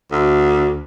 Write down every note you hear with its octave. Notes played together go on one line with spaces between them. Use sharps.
D2